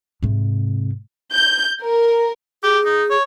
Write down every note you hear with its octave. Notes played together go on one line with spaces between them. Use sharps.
G#2 C3
G6
A#4
G4 G#4
D#4
C#5